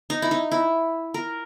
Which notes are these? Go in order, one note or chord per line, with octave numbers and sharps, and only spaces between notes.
D#4
E4
D#4
E4
A#4